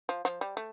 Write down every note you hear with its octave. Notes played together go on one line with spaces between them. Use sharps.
F3
F3
G3
A3